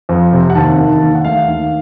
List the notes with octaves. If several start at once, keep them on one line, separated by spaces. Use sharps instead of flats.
F2
C3
F#5
D#2 A5
D#3
D#2
F#5
A3 F5
D#2